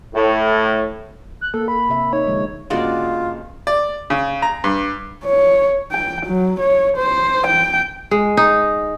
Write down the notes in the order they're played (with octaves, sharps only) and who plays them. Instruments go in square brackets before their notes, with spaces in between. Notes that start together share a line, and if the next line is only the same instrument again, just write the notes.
[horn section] A2
[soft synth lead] F#6
[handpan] A#3 [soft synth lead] A4
[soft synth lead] B5
[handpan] C3 E5
[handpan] D#4 [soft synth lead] C#5
[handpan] D3 F3 G#3
[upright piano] G1 C#3 A#3 [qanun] G#3 F#4 D5 [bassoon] F4
[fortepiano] D5
C#3
A#5
G2
[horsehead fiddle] C#5
G5
F#3
C#5
C5
G5
[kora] G#3
D#4